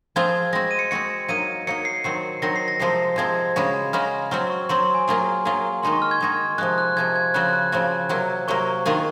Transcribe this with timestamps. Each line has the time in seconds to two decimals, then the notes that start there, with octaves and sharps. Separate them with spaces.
0.16 F3 C4 F4 G#4 G#6
0.53 G#3 C4 F#4 A#6
0.71 D#7
0.79 C#7
0.91 G#3 C4 F#4 C#7
1.29 F#3 A#3 D#4 D#7
1.67 F#3 A#3 D#4 C#7
1.85 C7
2.04 D#3 F#3 C4 F#4 C7
2.42 D#3 F#3 C4 F#4 A#6
2.56 C7
2.68 A#6
2.80 C3 F3 G#3 C4 C7
3.16 C3 F3 G#3 C4 G#6
3.56 C#3 G#3 C#4 F#4
3.93 C#3 G#3 C#4 F#4 F6
4.31 F#3 C4 F#4 F6
4.50 C#6
4.69 F#3 C4 F#4 C6
4.82 C6
4.94 G#5
5.08 F#3 A#3 F4 G#4
5.45 F#3 A#3 F4 G#4
5.83 D#3 G#3 D#4 F#4 C6
5.93 C#6
6.02 F6
6.11 G#6
6.21 D#3 G#3 D#4 F#4
6.58 C3 F3 G#3 F#6
6.78 F#6
6.97 C3 F3 G#3 G#6
7.16 G#6
7.34 C#3 F3 C4 F#4 F#6
7.53 F#6
7.72 C#3 F3 C4 F#4
8.09 C3 F#3 A#3
8.48 C3 F#3 A#3 C#6
8.86 D#3 A#3 F4 G#4